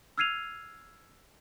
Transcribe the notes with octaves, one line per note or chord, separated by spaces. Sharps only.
E6 F6 G#6 C7 D#7 F7